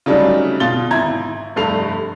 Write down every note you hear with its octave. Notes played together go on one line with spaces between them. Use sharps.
C#3 F#3 G3 A3 D4 D#4
B2 F4 A6 G7
G#1 E4 A#5 G#6
F1 G2 A3 C7 F7